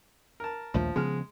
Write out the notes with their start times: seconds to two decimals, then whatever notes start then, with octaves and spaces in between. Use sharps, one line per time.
0.40 A#4 A5
0.74 A#1 D#2 F3 A3
0.96 C#3 F3 G#3 B3 F6